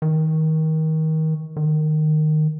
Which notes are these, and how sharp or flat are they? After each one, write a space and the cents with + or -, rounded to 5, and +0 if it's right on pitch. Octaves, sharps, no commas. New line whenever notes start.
D#3 +25
D#3 -15